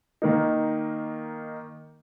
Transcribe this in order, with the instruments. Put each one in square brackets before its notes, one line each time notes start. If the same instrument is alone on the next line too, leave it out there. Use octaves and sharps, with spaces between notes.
[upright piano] D#3 A#3 D#4